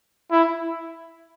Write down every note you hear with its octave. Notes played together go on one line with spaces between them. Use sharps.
E4